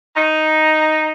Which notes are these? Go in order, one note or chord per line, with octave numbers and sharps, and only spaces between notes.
D#4